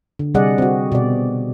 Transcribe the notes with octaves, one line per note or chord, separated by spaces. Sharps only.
D3
C3 G3 G#4 D5 D#5 F#5
C4 F#4
B2 D5